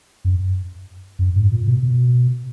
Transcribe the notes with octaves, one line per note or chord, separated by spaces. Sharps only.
F#2
F#2
G#2
A#2
B2
B2